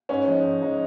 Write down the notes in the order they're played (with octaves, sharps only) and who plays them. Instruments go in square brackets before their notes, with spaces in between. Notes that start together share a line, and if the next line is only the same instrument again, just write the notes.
[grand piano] G#2 [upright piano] C#4
[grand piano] F3 G#3 D#4
G#2
F3 G#3 D#4